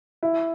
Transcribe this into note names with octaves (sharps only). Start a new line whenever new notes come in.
E4